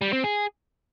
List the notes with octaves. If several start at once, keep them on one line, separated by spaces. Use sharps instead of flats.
G3
C4
G#4